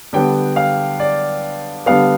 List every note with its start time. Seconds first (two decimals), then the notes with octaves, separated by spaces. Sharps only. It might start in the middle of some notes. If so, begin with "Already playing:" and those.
0.13 D3 G3 B3 G5
0.56 F5
1.00 D5
1.86 D3 G3 B3 F5